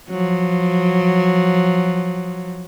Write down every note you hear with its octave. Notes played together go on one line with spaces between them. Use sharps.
F3 F#3